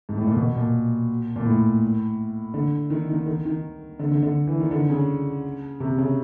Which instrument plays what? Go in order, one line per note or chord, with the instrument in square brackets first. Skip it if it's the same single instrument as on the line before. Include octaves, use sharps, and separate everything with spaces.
[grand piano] G#2
A2
A#2
B2
A#2
A#2
A2
D3
D#3
D#3
D#3
D#3
D3
D3
D3
E3
D#3
D3
C#3
C3
C#3